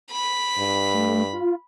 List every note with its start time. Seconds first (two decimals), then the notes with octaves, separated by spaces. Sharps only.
0.12 B5
0.58 G2
0.94 A3
1.33 F4